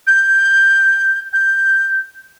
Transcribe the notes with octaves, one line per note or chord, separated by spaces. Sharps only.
G6
G6